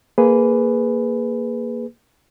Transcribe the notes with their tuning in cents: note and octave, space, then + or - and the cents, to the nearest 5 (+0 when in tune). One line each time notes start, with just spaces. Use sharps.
A#3 +0 G#4 +5 B4 +10